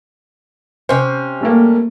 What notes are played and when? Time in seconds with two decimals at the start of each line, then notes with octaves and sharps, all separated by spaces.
0.89 C3 C#4 C5
1.41 G3 A3 A#3